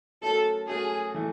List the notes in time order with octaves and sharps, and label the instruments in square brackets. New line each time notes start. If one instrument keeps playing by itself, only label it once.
[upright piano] F#3 A3 C#4 F#4 A#4 [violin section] A4
[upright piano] F#3 A3 C#4 F#4 A#4 [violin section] G#4
[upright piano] E3 A3